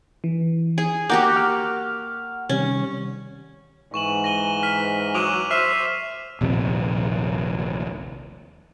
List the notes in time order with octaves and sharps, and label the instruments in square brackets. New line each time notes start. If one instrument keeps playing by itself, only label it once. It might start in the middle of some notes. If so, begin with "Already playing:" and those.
[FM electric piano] E3
[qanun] G#4
[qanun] A#3 F#4 G4 [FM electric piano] F#5 D6 G6
[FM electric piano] F#5 F6
[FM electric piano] C3 D#3 G3 [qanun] C#4
[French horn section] G#2 [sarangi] E3 [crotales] C#6 E7 F#7
[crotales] A#6 D#7 G7
F6 B6
[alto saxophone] F#3 [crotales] D6 D#7 F7
[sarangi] C5 [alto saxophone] E5 [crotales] C#6 F6 C7
[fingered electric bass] D#1 A#1 C3